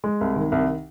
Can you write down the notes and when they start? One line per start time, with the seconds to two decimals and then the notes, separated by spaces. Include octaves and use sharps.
0.04 G#3
0.21 C2
0.36 D#3
0.52 C2